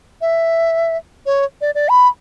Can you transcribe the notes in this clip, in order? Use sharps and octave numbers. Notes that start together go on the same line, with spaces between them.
E5
C#5
D5
D5
B5